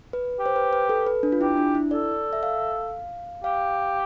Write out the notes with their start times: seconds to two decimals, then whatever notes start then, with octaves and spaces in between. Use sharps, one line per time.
0.13 B4
0.39 G4
0.46 C5
0.56 B4
0.73 B4
0.89 A4
1.06 B4
1.23 D4
1.32 F4
1.41 E4 G4
1.57 D4
1.75 E4
1.91 A4 D5
2.33 E5
2.43 F5
3.44 G4 F5